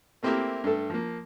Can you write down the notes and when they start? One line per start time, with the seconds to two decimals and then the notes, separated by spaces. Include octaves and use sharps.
0.23 A3 A#3 C4 E4 G4 A#4
0.64 G2 A3 A4
0.90 F3 A#3